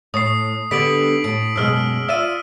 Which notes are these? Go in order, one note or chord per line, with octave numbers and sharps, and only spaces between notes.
A2 C#5 D#6 C7
D3 G3 B3 B6 D7 F#7
A2 D7
F#2 B2 G#3 E6 F6
F4 D5 E5 E6 D#7